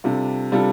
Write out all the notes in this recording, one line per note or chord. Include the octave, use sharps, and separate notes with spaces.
C3 G3 D4 F4 A4
C3 G3 D4 F4 A4